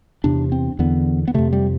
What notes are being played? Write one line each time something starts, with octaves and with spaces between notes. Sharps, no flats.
E2 C3 D4
C4
E2 D3 B3
B3
F2 C3 A3
G3